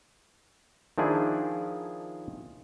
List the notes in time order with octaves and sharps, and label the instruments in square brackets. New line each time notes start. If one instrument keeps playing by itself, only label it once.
[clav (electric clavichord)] D#3 F3 D4 E4 G#4